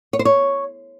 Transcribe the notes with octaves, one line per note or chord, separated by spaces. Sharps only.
C#5
C5
C#5